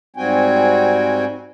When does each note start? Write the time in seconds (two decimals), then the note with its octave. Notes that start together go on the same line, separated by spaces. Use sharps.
0.17 G#2 G3 C4 F#4 G5 G#5